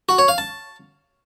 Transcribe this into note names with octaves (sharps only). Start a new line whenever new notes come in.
F#4
C#5
F5
A5